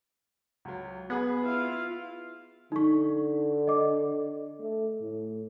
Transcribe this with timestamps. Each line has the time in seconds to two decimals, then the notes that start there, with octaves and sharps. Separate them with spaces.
0.65 C#2 F#3
1.10 B3 G#4 B4 F#5
1.42 E4 F4 F5
2.72 D3 D#4 C#6
3.67 D#5 D6
4.60 A3
5.01 A2